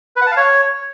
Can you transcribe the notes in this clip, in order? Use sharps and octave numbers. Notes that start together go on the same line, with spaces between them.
B4
F#5
A5
F5
C#5